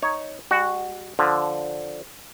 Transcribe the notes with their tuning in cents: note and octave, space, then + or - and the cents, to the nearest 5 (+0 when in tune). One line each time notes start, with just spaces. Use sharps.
D#4 +0 C#5 +0
G3 +40 F#4 +0
D3 +0 F3 +0